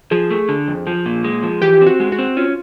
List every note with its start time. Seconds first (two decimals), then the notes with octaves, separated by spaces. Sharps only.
0.11 F3 G#4
0.31 A3
0.49 D3
0.68 F2
0.87 F3
1.06 A#2
1.24 G#3
1.43 F3
1.62 E3 G4
1.81 C4
1.87 F#4
2.00 G#3
2.12 F#4
2.19 C4
2.37 C#4 F4